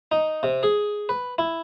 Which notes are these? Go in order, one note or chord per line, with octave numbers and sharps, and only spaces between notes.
D#4
C3
G#4
B4
E4